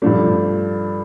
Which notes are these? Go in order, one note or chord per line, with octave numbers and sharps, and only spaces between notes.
G2 F3 A3 D4